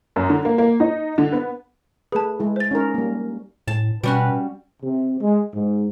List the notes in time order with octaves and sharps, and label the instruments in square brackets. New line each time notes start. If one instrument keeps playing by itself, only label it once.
[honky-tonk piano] F#2
D3
A#3
A#3
D#4
D3
B3
[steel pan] A3 B4 [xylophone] G#4 A5
[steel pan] G#3 E4
[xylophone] C5 A6
[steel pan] C#4 D#4 A#4
G3 A#3
[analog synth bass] A2 [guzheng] A5
[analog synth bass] B2 [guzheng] G3 C#4 F#4 [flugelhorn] B4
[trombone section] C3
G#3
G#2